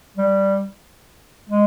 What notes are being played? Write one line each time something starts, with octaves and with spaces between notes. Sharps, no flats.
G3
G#3